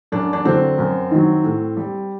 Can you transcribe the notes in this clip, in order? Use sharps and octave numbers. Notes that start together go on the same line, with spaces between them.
F#2 D4
D4
D3 F#3 C4
F#2
D#3 F#3
A2
G3